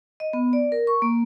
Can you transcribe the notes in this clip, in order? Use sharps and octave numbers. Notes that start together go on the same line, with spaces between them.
D#5
B3
D5
A#4
C#6
A#3